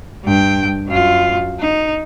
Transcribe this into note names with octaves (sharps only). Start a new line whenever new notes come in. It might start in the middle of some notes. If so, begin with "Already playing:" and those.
G2 G5
F#2 F4
D#4